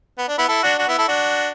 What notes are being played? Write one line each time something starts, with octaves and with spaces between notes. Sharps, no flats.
B3
D4
B3 E4
E4 A4
D4 F#4
D4 F#4
B3 E4
E4 A4
D4 F#4